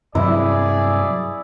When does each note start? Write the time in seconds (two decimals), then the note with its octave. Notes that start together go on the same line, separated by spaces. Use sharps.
0.15 G2 C3 F#3 E4 G#4 D5